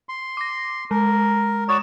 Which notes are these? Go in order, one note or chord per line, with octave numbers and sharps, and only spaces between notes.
C6
D6 A#6
G#3 A#4
F#4 C#5 D5 D#6 E7